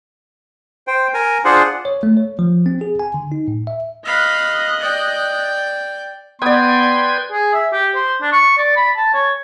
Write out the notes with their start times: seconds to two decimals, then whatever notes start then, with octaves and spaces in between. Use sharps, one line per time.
0.87 C5 G5
1.14 A#4 G#5
1.45 D4 F4 G#4 C5 F#5
1.85 C#5
2.03 A3
2.17 C#5
2.39 F3
2.66 C4
2.81 G#4
2.99 G#5
3.14 D3
3.32 D#4
3.48 A2
3.67 E5
4.05 D#5 F5 B5 F#6
4.80 D5 G5
6.42 B3 B4 D5 G5 C6 D#6 G#6
7.32 G#4
7.54 E5
7.73 G4
7.95 C5
8.21 D4
8.33 C#6
8.58 D5
8.76 B5
8.97 A5
9.14 C#5